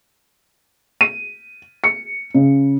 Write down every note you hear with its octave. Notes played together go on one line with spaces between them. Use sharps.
D#7
C#7
C#3